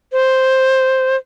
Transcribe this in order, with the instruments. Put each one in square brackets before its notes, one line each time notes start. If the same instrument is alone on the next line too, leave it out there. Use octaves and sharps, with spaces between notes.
[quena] C5